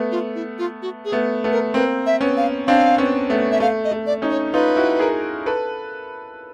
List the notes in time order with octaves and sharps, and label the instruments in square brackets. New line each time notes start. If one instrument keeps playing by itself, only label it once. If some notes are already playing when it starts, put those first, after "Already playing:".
Already playing: [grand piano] A3 B3
[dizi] F4
E4
F4
F#4
G#4
[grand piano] A3 B3
A3 B3
[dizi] A#4
[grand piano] A#3 C4 [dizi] B4
[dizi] E5
[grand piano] B3 C#4
[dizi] F5
[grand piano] C4 D4 [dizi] F5
[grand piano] B3 C#4
A3 B3
[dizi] E5
[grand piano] A3 [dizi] F5
[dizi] D#5
[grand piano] A3
[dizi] D5
[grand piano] C#4 D#4
[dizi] C#5
[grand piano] D#4 F4 [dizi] B4
[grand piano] E4 F#4
G#4 A#4
A4 B4